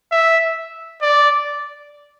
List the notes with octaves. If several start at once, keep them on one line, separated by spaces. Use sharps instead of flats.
E5
D5